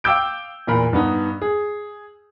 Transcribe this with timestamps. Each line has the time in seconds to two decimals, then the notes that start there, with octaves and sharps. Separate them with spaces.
0.04 F5 G5 D6 E6 G6 D7
0.67 E2 A#2 A#4 B5
0.93 G2 B3 D#4
1.42 G#4